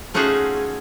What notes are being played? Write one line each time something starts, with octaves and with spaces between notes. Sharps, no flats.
A3 C#4 D#4 F4 F#4 G#4